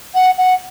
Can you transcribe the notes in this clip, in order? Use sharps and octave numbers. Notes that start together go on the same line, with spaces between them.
F#5
F#5